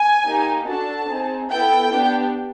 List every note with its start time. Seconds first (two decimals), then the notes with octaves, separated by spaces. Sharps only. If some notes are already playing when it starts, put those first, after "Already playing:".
Already playing: G#5
0.25 A#3 D#4 G4
0.67 D4 F#4 A4 A5
1.09 C4 D#4 G#4
1.50 B3 E4 A4 G5
1.92 B3 D4 G4